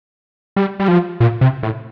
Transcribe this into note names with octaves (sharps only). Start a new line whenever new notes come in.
G3
G3
F3
A#2
C3
A2